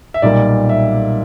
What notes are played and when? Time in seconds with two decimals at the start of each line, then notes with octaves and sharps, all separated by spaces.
0.14 E5
0.22 B1 A#2 G3 A#3 D5
0.69 E5